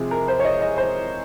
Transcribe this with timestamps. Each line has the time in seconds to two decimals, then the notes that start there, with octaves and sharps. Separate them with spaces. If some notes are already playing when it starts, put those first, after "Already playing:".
Already playing: C3 F3 G#3 C4 G#4
0.11 A#4
0.28 C5
0.39 C#5
0.44 D#5
0.61 D#5
0.78 C5